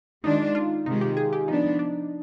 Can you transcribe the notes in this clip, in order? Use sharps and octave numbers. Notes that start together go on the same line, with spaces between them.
D#3 G#3 D4 D#4 F4
F4
C3 D#3 G#3 D#4
G4
G#4
G4
F3 B3 D4 D#4
D4